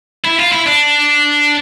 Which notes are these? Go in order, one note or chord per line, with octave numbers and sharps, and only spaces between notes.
E4
F4
E4
D4